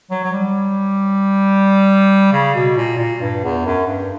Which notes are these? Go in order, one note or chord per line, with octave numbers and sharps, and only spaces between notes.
F#3
F#3
G3
C#3
B2
A#2
A#2
G2
E2
F#2
G2